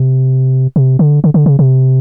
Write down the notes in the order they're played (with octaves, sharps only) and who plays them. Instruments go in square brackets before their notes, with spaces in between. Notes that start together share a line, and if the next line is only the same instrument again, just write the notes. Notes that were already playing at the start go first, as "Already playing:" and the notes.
Already playing: [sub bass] C3
C3
D3
D3
D3
C#3
C3